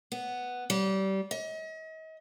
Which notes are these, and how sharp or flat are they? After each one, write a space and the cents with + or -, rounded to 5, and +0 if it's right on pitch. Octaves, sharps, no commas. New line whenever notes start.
B3 +0
G3 -25
D#5 +40